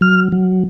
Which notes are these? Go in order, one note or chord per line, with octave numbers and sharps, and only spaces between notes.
F#3 F6
F#3